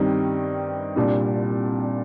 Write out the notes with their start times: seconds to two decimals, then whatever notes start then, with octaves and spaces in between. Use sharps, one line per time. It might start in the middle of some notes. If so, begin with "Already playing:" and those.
Already playing: G2 D#3 G3 C4 D#4
0.96 C2 A#2 G3 D4